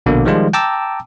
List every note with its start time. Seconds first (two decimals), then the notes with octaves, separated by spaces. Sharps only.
0.06 A#1 B2 D3 A#3
0.25 D#3 F3 G3 G#3 F4
0.53 G5 A5 A#5 D6 E6